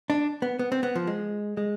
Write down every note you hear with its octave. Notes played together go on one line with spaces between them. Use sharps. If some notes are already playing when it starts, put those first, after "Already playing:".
D4
B3
B3
C4
B3
F3
G#3
G#3